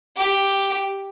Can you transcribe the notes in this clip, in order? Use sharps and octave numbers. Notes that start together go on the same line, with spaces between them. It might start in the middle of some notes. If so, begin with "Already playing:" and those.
G4